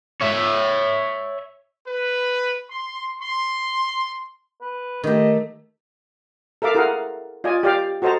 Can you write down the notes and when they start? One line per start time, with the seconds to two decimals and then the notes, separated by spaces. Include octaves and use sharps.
0.21 C#5 E5
1.88 B4
2.71 C6
3.22 C6
4.61 B4
5.04 D#3 A3 G4 D#5
6.62 A4 A#4 E5 F5 D6
6.75 E4 G#4 A#4 F5 F#5
7.44 F4 D5 D#5 G#5
7.63 G4 D5 F5 G5 D6
8.02 F#4 A4 C5 D#5 A5 A#5